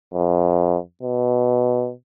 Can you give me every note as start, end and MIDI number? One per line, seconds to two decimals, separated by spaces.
0.14 0.77 41
1.03 1.91 47